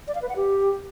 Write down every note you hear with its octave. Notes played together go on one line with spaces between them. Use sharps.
D5
F5
B4
F#5
G4